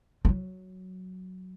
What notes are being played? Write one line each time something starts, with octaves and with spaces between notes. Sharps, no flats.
F3
F#3